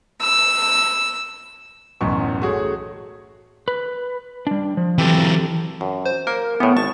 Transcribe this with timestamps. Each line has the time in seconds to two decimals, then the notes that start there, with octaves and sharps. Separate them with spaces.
0.21 E6
2.01 D1 B1 F#2 E3 C#6
2.42 A3 C#4 F#4 G#4 C#5
3.68 B4
4.47 G3 D4
4.77 F3
4.98 E3 F#3 C4 G4 A4
5.81 F#2
6.06 C5
6.27 A#3 A#4
6.60 A2 E3 B3
6.77 G#1 A5 C#6